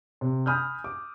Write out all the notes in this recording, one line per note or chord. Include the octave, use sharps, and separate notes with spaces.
C3
G#5 B5 D#6 F6 G6
D6